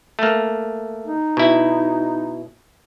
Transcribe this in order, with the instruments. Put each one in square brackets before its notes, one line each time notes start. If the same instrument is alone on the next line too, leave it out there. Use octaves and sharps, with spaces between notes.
[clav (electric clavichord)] A3 A#3
[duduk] D#4
[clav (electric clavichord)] B2 E4